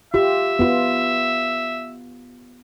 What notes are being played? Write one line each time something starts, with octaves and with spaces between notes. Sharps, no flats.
F4 G4 E5
B3 F4